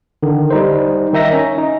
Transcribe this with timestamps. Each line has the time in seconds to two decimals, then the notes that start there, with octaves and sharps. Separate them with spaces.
0.23 D3 D#3
0.50 G3 D#4 C5
1.13 D#3 D#4 E5 A#6
1.33 C#4
1.58 D#4